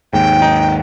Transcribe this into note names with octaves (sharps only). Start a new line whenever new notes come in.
D#2 G#2 G5
D#4